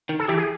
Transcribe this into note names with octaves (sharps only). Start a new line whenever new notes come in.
D#3
A4
E3 G4
G#4